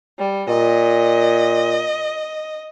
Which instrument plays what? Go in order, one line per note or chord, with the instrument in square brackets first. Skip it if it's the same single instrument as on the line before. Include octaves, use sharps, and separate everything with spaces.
[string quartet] G3
[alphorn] A#2 [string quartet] D#5